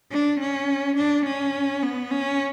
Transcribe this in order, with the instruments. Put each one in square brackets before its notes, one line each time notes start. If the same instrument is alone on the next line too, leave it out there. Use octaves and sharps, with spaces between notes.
[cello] D4
C#4
D4
C#4
B3
C#4